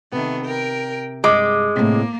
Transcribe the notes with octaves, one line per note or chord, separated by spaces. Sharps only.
C3 D#3 A3 B3
A#4 G5
G2 G#3 D6
A2 C3 A#3